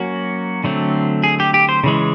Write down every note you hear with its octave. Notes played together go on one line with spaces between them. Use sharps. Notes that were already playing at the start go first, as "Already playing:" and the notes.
Already playing: F#3 A#3 C#4 F#4
D3 F#3 A3 C4
G#4
G4
G4
C5
C#3 E3 G#3